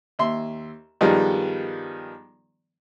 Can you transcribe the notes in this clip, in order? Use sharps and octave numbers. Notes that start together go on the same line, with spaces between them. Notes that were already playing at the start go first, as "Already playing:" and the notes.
D#2 E5 C6
G2 D#3 F3 G3 G#3 B3